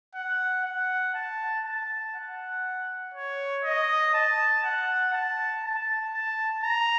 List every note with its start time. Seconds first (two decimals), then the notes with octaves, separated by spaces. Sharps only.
0.15 F#5
0.65 F#5
1.14 A5
1.65 A5
2.15 F#5
3.14 C#5
3.64 D#5
4.14 A5
4.64 F#5
5.13 A5
5.64 A5
6.14 A5
6.63 A#5